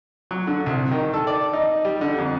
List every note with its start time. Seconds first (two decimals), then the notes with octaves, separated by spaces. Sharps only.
0.31 F#3
0.47 D3
0.66 C2
0.91 D#3
1.14 A4
1.27 D5
1.53 D#4
1.85 G3
2.01 D3
2.18 F2